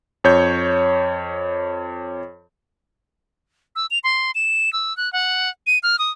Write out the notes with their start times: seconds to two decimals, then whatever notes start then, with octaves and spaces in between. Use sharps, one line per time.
0.24 F2 C#5 G6
3.76 E6
3.91 F7
4.04 C6
4.35 E7
4.73 E6
4.97 F#6
5.13 F#5
5.67 D#7
5.83 F6
5.99 D#6